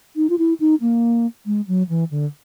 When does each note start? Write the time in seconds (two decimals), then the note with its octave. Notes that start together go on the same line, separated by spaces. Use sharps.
0.16 D#4
0.30 F4
0.38 E4
0.60 D#4
0.81 A#3
1.46 G#3
1.68 F#3
1.89 E3
2.11 D3